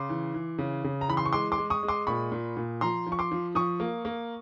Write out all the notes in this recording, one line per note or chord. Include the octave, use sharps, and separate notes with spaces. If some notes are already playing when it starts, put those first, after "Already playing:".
Already playing: C#3 C6 D6
E3
E3
C#3
C#3
A#5
E3 B5
C6
C#6
G#3 C6 D6
C6 D6
G#3
C#6 D#6
G#3
C6 D6
A#2 B5 C#6
A#2
A#2
F3 A#5 C6
F3
C#6
C6 D6
F3
F3 C#6 D#6
A#3
A#3